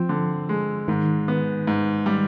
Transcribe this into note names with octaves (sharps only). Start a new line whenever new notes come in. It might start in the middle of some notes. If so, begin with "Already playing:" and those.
Already playing: F3 C4
D3
G#3
G#2 D#3
B3
G#2
G3